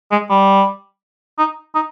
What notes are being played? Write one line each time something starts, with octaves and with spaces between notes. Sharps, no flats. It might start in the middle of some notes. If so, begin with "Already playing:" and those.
G#3
G3
D#4
D#4